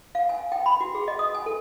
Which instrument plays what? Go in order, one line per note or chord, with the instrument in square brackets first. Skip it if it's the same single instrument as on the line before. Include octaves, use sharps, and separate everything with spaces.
[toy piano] F5
G#5
G5
B5
F#4
G#4
D#5
D#6
G#5
A4